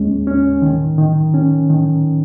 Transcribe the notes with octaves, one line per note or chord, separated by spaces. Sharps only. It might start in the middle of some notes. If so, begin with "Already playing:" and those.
Already playing: D#2 G#3 C#4
C#4
D#3
D#3
C#4
D#3